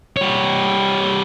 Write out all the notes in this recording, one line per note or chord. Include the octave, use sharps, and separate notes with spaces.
G3 C#5